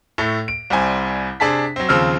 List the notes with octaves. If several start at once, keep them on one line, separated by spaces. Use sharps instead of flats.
A2 A3
D7
C2 G3 C4 G#5
C3 D4 G#4 A5 B6
F#3 C4
D#2 C#3 F3 C4 E6 F6